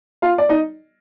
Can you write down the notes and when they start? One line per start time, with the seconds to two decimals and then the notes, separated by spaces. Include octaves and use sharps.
0.22 F4 F5
0.38 D5
0.49 D#4 D#5